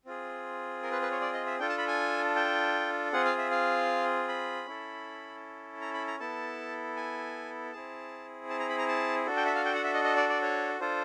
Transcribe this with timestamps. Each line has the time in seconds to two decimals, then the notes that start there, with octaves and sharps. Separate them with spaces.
0.05 C4 F4 G#4
0.83 A#4
0.92 B4
1.02 B4
1.11 C#5
1.21 D5
1.33 D#5
1.46 E5
1.59 D4 F4 A4 G5
1.69 A5
1.78 B5
1.88 G#5
2.36 G5
3.13 C4 F4 G#4 F#5
3.25 F5
3.38 E5
3.51 F5
4.28 B5
4.66 C#4 E4 A4
5.81 A#5
5.94 B5
6.07 A#5
6.19 B3 E4 A4 A5
6.96 G#5
7.73 C4 E4 G#4 A5
8.50 A5
8.60 A#5
8.69 B5
8.78 A#5
8.88 A5
9.26 D4 F#4 A4
9.37 G5
9.46 E5
9.55 F5
9.65 G5
9.75 F#5
9.84 E5
9.94 D#5
10.04 D#5
10.16 D5
10.29 D5
10.42 C#5
10.80 D4 F4 A4 C5